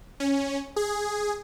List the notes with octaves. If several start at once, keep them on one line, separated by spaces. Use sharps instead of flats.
C#4
G#4